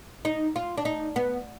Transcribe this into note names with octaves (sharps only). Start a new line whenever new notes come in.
D#4
F4
D4
D#4
B3